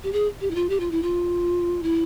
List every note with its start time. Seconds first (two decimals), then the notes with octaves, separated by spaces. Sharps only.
0.04 G4
0.13 G#4
0.41 G4
0.51 E4
0.55 F4
0.69 G4
0.80 F4
0.91 E4
1.02 F4
1.83 E4